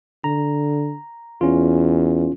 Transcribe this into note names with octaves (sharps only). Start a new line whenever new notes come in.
D3 A#5
E2 C#4 F4